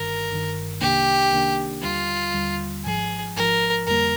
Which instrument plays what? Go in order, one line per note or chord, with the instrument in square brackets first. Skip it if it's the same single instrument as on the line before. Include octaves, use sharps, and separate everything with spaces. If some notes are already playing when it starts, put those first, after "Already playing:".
Already playing: [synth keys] G1 G2 D#3 [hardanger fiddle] A#4
[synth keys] G1 G2 D#3
[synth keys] C2 C3 D#3 A#3 D4 [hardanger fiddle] G4
[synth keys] C2 C3 D#3 A#3 D4
[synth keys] D#2 D3 G3 [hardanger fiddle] F4
[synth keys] D#2 D3 G3
[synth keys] G#1 G#2 F3 [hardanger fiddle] G#4
[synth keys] G#1 G#2 F3 [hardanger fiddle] A#4
[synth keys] F2 D3 G3 A#3 [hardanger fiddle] A#4